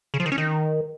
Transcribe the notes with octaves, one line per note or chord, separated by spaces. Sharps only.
C#3
F3
D#3
C#4
D#3